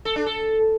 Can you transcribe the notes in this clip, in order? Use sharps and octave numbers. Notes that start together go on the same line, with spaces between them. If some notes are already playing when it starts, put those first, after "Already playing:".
A4
D4
A4